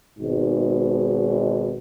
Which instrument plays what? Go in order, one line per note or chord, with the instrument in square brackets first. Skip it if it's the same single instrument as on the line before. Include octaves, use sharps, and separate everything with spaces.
[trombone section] G#1 G#2 B2